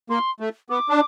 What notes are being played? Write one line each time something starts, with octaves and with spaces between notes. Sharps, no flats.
A#3 C6
A3
B3 D6
D4